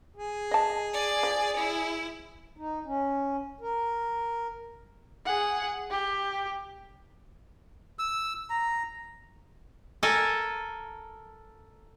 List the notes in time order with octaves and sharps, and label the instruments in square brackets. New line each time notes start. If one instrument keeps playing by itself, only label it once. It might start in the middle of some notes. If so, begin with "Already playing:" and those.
[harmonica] G#4
[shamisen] D#5 A5
[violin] D5
[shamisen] F3
[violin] E4
[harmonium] D#4
C#4
A#4
[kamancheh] G#4 F#5
G4
[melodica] E6
A#5
[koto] A4 A#4 G#5 A5